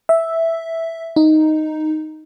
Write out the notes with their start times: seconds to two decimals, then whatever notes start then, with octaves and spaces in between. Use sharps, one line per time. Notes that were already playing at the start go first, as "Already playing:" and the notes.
0.09 E5
1.16 D#4